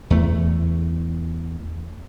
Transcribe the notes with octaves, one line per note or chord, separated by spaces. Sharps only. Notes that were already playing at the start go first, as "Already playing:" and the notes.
E2 A3